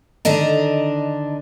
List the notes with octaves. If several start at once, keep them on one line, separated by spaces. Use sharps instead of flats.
D3 D#3 D4 D#5 A#5